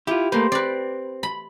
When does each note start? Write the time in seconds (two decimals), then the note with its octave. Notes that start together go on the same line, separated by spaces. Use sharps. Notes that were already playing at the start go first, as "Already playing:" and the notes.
0.07 E4 F4 G4
0.32 A3 A#3 B4 C5
0.52 C4 B4 D5
1.23 B5